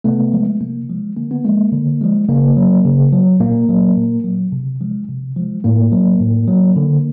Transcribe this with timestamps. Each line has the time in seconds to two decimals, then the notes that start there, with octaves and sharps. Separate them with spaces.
0.04 C3 A3 B3
0.33 F3 G#3
0.61 C3 A#3
0.89 F3 G#3
1.17 D3 A#3
1.31 B3
1.44 F3 G#3 A#3
1.72 D3
2.01 F3 G#3
2.29 C#3 A#3
2.57 F#3
2.85 C#3
3.13 F#3
3.40 A#2 A#3
3.69 F#3
3.97 A#2
4.24 F#3
4.52 C3
4.81 F3 G#3
5.08 C3
5.37 F3 G#3
5.64 A2 A#3
5.92 F#3
6.21 A2
6.48 F#3
6.76 D3